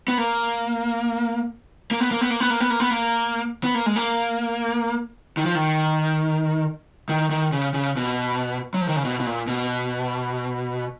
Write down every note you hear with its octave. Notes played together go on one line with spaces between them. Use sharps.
B3
A#3
A#3
B3
A#3
B3
A#3
B3
A#3
B3
A#3
B3
A#3
B3
A#3
G#3
A#3
D#3
F3
D#3
D#3
D#3
C#3
C#3
B2
F#3
F3
D#3
C#3
B2
B2
A#2
B2